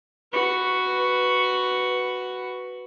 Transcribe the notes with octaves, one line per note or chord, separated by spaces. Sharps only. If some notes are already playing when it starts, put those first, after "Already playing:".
F#4 B4